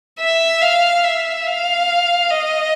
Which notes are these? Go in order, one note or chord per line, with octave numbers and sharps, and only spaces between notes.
E5
F5
E5
F5
D#5